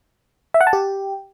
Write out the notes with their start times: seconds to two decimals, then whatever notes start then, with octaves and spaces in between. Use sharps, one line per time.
0.54 E5
0.61 F#5
0.67 A5
0.73 G4